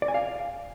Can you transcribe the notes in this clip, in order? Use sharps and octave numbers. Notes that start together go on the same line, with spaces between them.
D5
G#5
F5